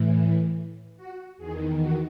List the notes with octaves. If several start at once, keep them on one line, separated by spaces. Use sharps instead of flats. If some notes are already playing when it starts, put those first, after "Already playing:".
Already playing: A2 E3
F#4
E2 D#3 G#4
F#4